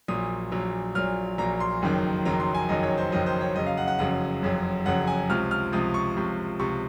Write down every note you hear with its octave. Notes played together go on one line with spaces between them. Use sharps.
A#1 A#2 F#3 D#6
A#1 A#2 F#3
A#1 A#2 F#3 F6
A#1 A#2 F#3 A#5
C6
F#1 F2 D#3 F#3
F#1 F2 D#3 F#3 A#5
C6
G#5
F#1 F2 D#3 F#3 D#5
C#5
C5
F#1 F2 D#3 F#3 D#5
C5
C#5
F#1 F2 C#3 F#3 D#5
F5
F#5
F#5
F#1 F2 C#3 F#3 F#5
F#1 F2 C#3 F#3
F#1 F2 C#3 F#3 F#5
G#5
C#2 C3 F3 F6
F6
C#2 C3 F3 D#6
C#6
C#2 C3 F3
C#2 C3 F3 C#6